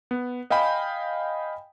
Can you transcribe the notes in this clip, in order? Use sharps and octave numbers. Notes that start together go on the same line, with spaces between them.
B3
D#5 F5 G5 G#5 B5